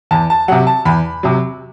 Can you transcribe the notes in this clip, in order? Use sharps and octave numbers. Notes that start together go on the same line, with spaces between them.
E2 A5
A5
C3 F#3 F#5
A5
E2 B5
C3 F#3